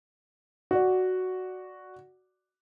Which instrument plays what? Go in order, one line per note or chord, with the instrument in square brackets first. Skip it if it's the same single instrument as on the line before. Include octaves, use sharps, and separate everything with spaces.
[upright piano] F#4 D5